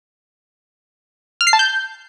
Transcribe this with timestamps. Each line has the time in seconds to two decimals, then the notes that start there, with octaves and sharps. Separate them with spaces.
1.41 F6
1.47 C7
1.53 A5
1.59 G6